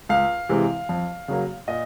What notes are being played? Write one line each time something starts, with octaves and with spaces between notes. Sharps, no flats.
C#2 F5
C3 E3 G#3
F2
C#3 F#3 A#3
A#2 D#5